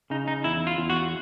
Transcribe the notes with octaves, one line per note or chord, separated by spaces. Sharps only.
C#3 D#4
D#4
E2 E4
F4
E2
F#4